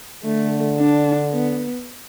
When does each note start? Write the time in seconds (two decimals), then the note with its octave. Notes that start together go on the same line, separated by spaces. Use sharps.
0.25 D3 A3
0.78 D4
1.32 B3